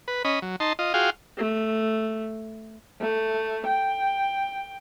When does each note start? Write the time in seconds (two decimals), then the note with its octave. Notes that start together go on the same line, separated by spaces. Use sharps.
0.08 B4
0.25 C#4 D#5 B5
0.42 F#3
0.60 D#4 A5 C6
0.79 F4 D#5
0.94 F4 F#4 G#4 F5 G5
1.37 A3
3.01 A3
3.66 G5